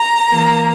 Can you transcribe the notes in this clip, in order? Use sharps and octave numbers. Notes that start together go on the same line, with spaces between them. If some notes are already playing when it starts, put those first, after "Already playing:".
Already playing: A#5
E3 A#3